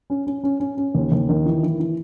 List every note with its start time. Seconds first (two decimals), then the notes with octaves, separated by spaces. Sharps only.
0.10 C#4
0.27 C#4
0.44 C#4
0.60 C#4
0.77 C#4
0.95 D#2
1.12 D#2
1.29 D#3
1.46 E3
1.63 E3
1.80 E3